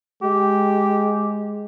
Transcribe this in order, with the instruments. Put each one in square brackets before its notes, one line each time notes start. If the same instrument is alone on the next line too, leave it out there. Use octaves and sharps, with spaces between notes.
[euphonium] G#3 [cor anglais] G4